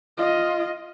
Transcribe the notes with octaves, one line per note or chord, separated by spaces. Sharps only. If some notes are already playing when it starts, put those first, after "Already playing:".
F4 D#5